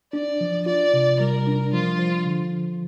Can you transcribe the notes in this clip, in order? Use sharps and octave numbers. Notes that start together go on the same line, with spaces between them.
D4 D5
F3
F4 D5
C3
G3 A#4
D4
F3 F4
F3
D3